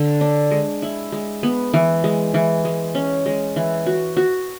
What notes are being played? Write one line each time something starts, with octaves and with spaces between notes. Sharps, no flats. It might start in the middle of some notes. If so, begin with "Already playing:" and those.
Already playing: D3
D4
G#3
E4
G#3
B3
E3
G#3
E3
G#3
C#4
G#3
E3
F#4
F#4